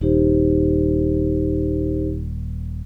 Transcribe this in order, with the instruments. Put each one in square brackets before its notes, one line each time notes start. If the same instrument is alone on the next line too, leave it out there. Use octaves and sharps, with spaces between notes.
[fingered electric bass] D#1 [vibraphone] D#4 G4 C5